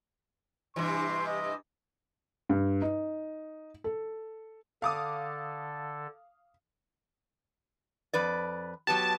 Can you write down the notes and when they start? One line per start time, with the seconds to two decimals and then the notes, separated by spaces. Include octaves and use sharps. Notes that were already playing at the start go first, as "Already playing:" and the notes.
0.76 G2 C3 E3 C6
1.26 D#5
2.49 G2
2.82 D#4
3.84 A4
4.82 D3 A4 F5 D6 D#6
8.13 F2 B4 D5
8.87 F#3 B3 G4 A5